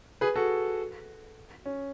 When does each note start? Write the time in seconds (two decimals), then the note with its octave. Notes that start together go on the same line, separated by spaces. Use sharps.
0.21 G#4 B4
0.36 F#4 A4
1.66 C#4